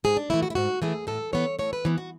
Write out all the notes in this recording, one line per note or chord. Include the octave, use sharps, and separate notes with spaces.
G#2 G#4
D4
E3 A3 E4
F#4
E4
G#2 F#4
E3 A3 G#4
A2 A4
E3 B3 C#5
A2 C#5
B4
E3 B3
F#4